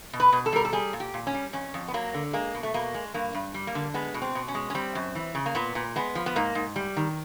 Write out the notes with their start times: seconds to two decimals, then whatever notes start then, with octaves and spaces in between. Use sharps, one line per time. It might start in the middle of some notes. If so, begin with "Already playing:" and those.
0.13 B2
0.20 B4
0.32 B2
0.46 A4
0.53 G3 A#4
0.65 A4
0.73 G3 G#4
0.93 A#2
1.00 G4
1.14 A#2
1.27 C#4
1.34 G3
1.53 F2 C#4
1.74 F2
1.88 B3
1.94 F#3 A#3
2.14 D3
2.33 G#3 A#3
2.55 B2
2.63 A3
2.74 B2 A#3
2.94 G#3
3.14 G2 A#3
3.34 G2
3.54 G3
3.67 A#3
3.75 D3
3.94 G#3 B3
4.14 B2
4.22 C4
4.35 B2
4.48 C#4
4.55 G#3
4.70 C#4
4.75 G3 C4
4.95 F#2
5.15 E3
5.35 C#3
5.46 A#3
5.55 A#2 B3
5.75 A#2
5.96 G#3 B3
6.15 F3
6.26 B3
6.36 G#2 A#3
6.55 G#2
6.76 G3
6.97 D#3